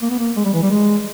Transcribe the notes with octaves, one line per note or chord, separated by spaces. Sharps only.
A#3
B3
A#3
G#3
G3
E3
G3
G#3